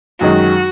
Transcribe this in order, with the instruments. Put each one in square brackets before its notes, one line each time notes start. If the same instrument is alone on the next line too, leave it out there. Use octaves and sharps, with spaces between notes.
[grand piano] F#2 D#3 G#3 D#4 [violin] F#4